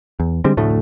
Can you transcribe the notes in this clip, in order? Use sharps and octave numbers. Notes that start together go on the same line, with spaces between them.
E2
D3 G3 G#3 C4
F1 D2 A2 A3